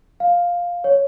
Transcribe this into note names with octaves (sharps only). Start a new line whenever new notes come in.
F5
C#5